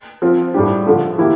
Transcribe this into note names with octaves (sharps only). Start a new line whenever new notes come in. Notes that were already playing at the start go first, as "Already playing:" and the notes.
F3 C4 F4
A2 G3 D4 G4
D3 F3 A3
E3 A#3 E4 G4